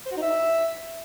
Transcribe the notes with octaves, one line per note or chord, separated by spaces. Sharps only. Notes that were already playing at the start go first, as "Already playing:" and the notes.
C5
F#4
D#4
E5